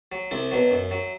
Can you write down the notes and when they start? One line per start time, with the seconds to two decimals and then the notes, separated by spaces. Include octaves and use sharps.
0.12 F#3
0.31 C2 E4
0.51 B2 F#3
0.71 F#2
0.91 F#3